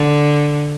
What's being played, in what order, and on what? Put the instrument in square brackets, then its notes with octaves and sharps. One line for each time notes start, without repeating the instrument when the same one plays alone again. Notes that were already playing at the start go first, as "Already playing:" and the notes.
Already playing: [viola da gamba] D3